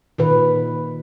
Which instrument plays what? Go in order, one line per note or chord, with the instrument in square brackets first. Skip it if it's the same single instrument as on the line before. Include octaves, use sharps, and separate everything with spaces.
[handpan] A#2 D#3 B4